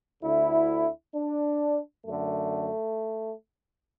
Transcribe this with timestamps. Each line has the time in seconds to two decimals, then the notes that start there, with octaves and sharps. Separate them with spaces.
0.23 D2 D3 E4
1.15 D4
2.05 F#2 D3 A3